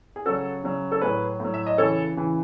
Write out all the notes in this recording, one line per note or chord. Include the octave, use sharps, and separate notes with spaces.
G#4
C#3 F#3 F#4 A4
C#3 F#3
A4
A2 F#3 G#4 B4
A2 F#3
E5
D#5
C#3 E3 A4 C#5
C#3 E3